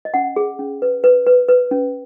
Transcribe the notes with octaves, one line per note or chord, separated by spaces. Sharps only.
D#5
C#4 F#5
G#4
C#4
B4
B4
B4
B4
C#4